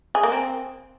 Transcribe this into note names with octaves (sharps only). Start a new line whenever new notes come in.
G#4
A#3
C4